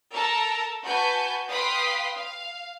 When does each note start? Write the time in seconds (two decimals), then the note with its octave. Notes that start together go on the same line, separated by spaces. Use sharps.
0.12 A4 A#4 A5 A#5 E6
0.84 F#4 B4 G#5 A5 G6
1.49 B4 F5 G5 C6 D#6 B6
2.14 F5